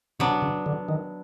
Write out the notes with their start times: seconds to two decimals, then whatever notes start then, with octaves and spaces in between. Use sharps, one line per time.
0.20 C3 F#3 B3 D4
0.42 C#3
0.66 D3
0.89 D#3